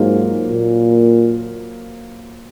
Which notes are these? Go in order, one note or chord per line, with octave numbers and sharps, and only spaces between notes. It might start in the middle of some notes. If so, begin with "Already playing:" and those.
Already playing: G#2 F#3 A#3 F4 C5
A#2